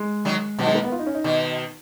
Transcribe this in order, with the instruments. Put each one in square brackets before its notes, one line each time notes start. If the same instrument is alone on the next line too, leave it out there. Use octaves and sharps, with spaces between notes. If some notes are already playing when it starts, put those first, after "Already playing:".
Already playing: [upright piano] G#3
[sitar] D#3 F#3
[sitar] B2 D#3 [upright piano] F#3
[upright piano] G#3
A#3
B3
F4
D#4
C#4
D#4
[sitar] B2 D#3